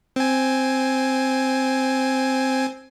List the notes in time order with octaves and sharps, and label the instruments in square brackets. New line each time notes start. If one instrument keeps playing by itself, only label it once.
[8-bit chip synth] C4 G#5